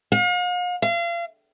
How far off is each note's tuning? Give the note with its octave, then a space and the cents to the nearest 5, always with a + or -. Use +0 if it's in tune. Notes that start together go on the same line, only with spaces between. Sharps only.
F5 +45
F5 -35